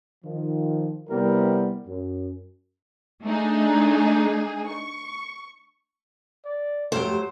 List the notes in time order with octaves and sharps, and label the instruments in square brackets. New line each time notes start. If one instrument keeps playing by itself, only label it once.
[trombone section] D#3 F3
C3 G3 B3 C4 E4 A#4
F#2
[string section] A3 D4 D#4 G#4
C#6
[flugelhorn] D5
[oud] F2 A3 G4 [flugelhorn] F#3 [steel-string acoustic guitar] C5